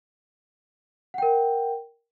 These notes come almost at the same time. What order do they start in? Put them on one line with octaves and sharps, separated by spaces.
F#5 G5 A#4